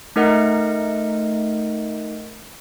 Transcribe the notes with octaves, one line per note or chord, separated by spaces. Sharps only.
A3 D#4 A#4 D#5 F#5